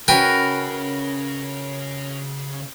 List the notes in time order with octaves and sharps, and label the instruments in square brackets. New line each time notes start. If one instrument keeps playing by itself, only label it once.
[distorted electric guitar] C#3 [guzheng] C#4 F#4 B4 [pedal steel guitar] A#4 [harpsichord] G5 G#5